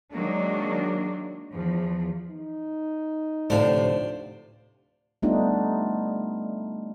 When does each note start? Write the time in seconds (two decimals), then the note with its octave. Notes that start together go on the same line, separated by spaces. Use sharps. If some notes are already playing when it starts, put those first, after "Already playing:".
0.13 D#3 F#3 G#3 A#3 D4
1.53 E2 F3
2.31 D#4
3.50 D2 A2 C3 F3 C4 D4 C5 F5
5.22 G3 A3 B3 D4 D#4 F4